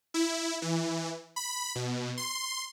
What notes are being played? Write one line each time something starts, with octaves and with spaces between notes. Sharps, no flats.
E4
E3
B5
B2
C6